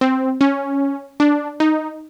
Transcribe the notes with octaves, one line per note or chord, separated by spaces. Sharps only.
C4
C#4
D4
D#4